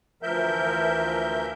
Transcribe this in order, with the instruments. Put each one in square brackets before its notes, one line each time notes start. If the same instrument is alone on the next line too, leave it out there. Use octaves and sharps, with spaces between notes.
[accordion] D2 E3 F3 A#4 E5 G6